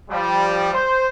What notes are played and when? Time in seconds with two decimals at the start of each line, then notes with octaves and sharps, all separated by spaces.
0.10 F3 G3
0.73 C5